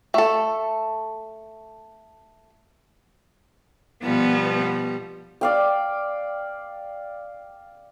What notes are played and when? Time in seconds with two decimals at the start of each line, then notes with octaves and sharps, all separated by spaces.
0.14 A3 A4
4.03 B2 F3 G3 B3
5.41 D5 F5 G5